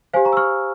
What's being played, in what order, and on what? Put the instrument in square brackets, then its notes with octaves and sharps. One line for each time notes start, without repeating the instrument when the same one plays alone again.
[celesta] G4 C5 F5 G#5
A#5 C#6
E6
C#6 F6